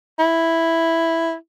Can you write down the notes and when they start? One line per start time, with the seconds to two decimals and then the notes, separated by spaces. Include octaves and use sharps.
0.19 E4